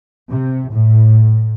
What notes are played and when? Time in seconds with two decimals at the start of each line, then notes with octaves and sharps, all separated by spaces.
0.30 C3
0.71 A2